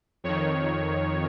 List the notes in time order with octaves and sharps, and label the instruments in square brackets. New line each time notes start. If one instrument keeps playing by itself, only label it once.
[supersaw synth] F2 D#3 C#5